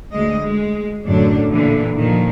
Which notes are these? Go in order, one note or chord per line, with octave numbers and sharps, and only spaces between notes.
D2 G#3 D#5
G#3
F#2 A2 D3 D4
A#2 D3 E3 A#3
A#2 D#3 F3